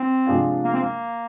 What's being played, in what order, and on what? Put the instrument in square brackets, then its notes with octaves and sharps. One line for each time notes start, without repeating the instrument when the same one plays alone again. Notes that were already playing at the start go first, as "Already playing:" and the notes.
Already playing: [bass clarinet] C4
[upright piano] C3 F3 G#3 D4 F4
[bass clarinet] A#3
C4
A#3